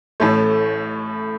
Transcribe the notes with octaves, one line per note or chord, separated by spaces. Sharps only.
A1 A2 A3